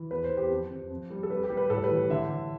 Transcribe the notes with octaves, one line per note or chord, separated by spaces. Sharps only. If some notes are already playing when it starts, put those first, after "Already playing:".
Already playing: E3
E2 B4
C5
E2
G4
F2
F2
F2
G3
A4
G3 B4
G4
G3
B4
A2 A4
B4
E3
D3 E5
D3